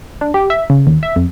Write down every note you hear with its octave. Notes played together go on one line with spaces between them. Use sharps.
D4
G4
E5
C#3
D#2
E5
F2